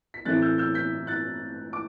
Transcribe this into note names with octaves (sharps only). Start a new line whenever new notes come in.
B6
A2 E3 A3 C4 E4 F#6 A6
E6 G6
E6 G6
G6 B6
F#6 A6
D6